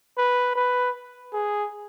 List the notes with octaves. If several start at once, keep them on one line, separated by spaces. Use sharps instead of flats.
B4
B4
G#4